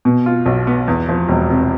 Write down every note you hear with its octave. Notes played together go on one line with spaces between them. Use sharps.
B2
F4
B1
B3
E2
F3
E1
C3